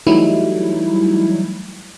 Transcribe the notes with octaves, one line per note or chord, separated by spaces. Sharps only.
E3 F#3 G3 A3 D#4 E4